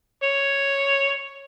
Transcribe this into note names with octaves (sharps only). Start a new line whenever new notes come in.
C#5